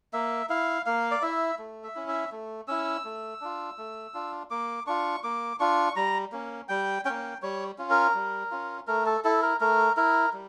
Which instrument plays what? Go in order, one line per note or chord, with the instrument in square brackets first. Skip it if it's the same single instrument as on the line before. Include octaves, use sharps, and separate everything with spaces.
[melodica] A#3 E5
E4 F5
A#3 F5
D5
E4 E5
A3
E5
C#4 E4
E5
A3
C#4 E4 E6
A3
D4 F4
A3
D4 F4
A#3 D6
D4 F4 C#6
A#3 D6
D4 F4 C#6
G3 A#5
A#3 C#4
G3 G5
A#3 C#4 G5
G3 C#5
C#4 F4
A#4
G3
C#4 F4
A3 A#4
A4
E4 A4
A#4
A3 A#4
E4 A#4
G3